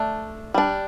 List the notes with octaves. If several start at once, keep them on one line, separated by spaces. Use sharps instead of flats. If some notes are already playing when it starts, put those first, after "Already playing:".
Already playing: A3 D4
G3 D4